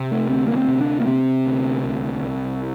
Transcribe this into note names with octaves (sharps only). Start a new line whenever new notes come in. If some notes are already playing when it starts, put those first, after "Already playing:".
Already playing: C3
A3
D2 C4
A#3
C4
C3
D4
A#3
C3 C4
D2
C2
C2